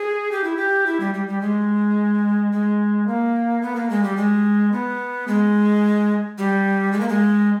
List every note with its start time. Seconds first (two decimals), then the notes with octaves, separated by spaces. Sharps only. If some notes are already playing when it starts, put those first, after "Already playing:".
Already playing: G#4
0.31 G4
0.44 E4
0.57 G4
0.86 E4
1.00 G3
1.14 G3
1.28 G3
1.42 G#3
2.52 G#3
3.07 A#3
3.62 B3
3.76 A#3
3.90 G#3
4.03 G3
4.17 G#3
4.72 B3
5.28 G#3
6.38 G3
6.92 G#3
7.00 A#3
7.09 G#3